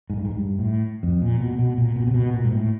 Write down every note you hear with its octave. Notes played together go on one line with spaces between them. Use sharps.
G#2
G2
G#2
G2
A2
F2
A#2
B2
B2
A#2
B2
C3
B2
A#2
G#2
A2